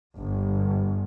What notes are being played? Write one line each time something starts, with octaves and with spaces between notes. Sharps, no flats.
G1